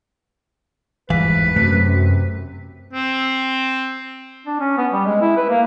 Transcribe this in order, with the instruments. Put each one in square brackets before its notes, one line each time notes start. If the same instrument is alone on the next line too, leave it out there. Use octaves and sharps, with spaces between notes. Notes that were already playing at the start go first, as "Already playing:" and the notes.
[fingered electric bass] G1 E2 G#2 [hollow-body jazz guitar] E3 F5 [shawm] B4
[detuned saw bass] F#2 [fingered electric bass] C3 [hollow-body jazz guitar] A3
[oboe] C4
[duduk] D4
C#4
B3
G3
G#3
E4
B4
A#3